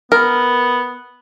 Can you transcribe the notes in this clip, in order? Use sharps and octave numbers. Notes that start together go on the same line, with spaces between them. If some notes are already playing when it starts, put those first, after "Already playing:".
B3 A#4